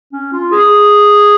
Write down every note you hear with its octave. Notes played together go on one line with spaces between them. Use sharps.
C#4
F4
G#4